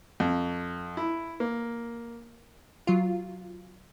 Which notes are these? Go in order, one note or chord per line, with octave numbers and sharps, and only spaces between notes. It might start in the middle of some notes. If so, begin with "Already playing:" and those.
F2
E4
A#3
F#3 F4